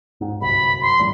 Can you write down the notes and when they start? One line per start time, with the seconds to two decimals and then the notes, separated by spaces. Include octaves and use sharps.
0.21 G#2
0.41 G1 C2 F#2 B5
0.82 C6
0.99 A2 E3 G3